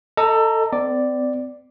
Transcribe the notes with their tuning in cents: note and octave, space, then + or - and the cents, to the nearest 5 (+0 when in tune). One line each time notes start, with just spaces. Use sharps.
A4 +20 D#5 +0 A#5 +0
C4 -40 D5 +0